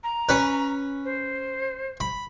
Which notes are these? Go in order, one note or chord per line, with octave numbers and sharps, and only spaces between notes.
A#5
C#4 B4
C5
B5